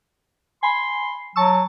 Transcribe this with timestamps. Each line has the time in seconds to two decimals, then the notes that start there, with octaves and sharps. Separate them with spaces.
0.63 G#5 B5 C6
1.36 F#3 A5 C#6 E6